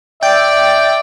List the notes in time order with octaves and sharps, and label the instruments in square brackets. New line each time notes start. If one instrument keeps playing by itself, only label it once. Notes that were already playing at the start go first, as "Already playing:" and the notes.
[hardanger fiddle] D5 [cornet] E5 [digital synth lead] G5